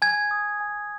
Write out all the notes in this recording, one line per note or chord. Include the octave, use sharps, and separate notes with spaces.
G#5 G#6
D#6
G#5